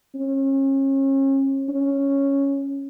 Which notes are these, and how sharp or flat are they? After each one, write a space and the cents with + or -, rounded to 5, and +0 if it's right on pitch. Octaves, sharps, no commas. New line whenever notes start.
C#4 -35
C#4 -5